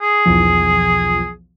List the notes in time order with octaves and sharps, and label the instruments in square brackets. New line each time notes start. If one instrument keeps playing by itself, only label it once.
[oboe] G#4
[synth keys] B1 E2 F3